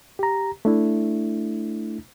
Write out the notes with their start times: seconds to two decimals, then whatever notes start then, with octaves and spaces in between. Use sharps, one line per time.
0.19 G4 A#5
0.65 A3 D4 E4